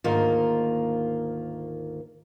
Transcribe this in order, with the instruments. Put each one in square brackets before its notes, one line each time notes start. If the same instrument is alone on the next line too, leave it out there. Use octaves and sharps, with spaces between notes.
[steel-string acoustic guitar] D2 G#2 D#3 A#3 F4